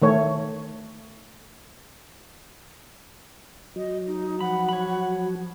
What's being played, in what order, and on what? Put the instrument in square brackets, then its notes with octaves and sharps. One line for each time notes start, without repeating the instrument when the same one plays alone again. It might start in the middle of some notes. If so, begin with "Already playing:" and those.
[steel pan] D#3 A3 C#5
[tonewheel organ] F#3 [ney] D#5
[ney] D#4
[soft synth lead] F3 [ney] F#5 [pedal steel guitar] B5
[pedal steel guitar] C#5 B5